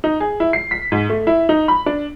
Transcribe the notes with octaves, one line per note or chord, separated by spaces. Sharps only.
D#4
G#4
E4
C7
B6
G#2
A3
E4
D#4
B5
D4